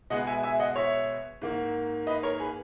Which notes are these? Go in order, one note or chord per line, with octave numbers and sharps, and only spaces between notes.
B2 G#3 B3 D#5 F#5
E5 G#5
E5 G#5
D#5 F#5
C#5 E5
G#2 D#3 A#3
B4 D#5
A#4 C#5
G#4 B4